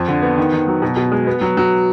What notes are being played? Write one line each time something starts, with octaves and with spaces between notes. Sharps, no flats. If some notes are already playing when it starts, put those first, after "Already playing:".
Already playing: F2
D3
B3
D#3
D#3
F#3
B2
B2
G#3
B3
F#3
F#3